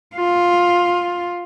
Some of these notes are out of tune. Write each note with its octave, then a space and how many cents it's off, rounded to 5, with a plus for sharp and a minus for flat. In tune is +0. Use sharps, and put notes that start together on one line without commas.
F4 +10